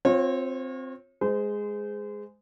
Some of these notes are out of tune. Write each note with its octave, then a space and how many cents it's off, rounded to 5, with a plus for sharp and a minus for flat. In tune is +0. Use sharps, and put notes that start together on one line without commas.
C4 +0 F4 +25 C#5 -30
G#3 +0 C5 -30